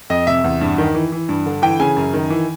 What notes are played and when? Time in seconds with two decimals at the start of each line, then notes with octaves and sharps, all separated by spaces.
0.10 F2 D#5
0.27 C3 E5
0.44 E2
0.61 G2
0.78 D#3
0.95 E3
1.12 E3
1.29 G2
1.46 D3
1.62 E3 G5
1.80 C#3 G#5
1.96 F#2
2.14 D#3
2.30 E3